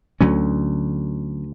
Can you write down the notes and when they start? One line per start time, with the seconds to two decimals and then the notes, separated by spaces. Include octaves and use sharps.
0.21 D2 D3 F#3 C#4